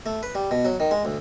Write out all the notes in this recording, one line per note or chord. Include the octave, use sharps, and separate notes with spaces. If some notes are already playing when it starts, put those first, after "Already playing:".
A3
B4
G3
B2
F#3
D#3
G#3
D2